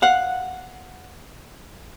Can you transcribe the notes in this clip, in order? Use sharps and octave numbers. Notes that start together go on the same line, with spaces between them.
F5 F#5